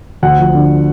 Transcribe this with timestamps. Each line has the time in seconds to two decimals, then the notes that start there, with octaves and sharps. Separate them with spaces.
0.23 D2 F#5
0.39 F3
0.54 D3